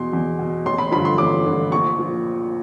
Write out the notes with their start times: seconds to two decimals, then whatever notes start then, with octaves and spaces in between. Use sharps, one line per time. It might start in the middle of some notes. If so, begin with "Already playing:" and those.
Already playing: E2 B2 C6
0.13 E2
0.39 B2
0.66 A1 C6
0.78 B5
0.92 G2 D3 F3 B5
1.05 C6
1.18 A1 D6
1.45 G2 D3 F3
1.72 A#1 C#6
1.99 A#2 F3